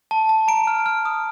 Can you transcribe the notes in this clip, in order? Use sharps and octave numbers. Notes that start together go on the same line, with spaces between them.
A5
A5
A#5 D7
F6
F6
D#6